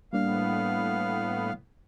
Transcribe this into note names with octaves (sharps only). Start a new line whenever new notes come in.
A2 G3 A#3 B3 D4 F5